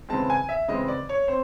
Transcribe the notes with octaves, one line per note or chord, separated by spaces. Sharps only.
C#3 E3 G#3 C4 A5
G#5
E5
C#3 E3 G#3 C4 D#5
D5
C#5
C4 C5